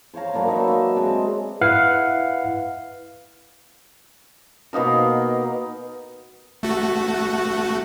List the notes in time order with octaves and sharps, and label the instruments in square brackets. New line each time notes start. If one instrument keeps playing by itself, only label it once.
[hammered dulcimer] C5 C#5 F5 A#5
F#3 A#3 D4 B4
D4 D#4 B4 E5
E5
G#3 C4 D4
[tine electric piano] E4 B4 F5 F#5
[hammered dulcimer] B2 A#3 D#4 A#4
[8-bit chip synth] A3 F#4